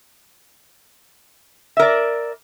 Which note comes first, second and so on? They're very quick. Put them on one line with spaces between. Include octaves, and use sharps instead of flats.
E5 A#4 D5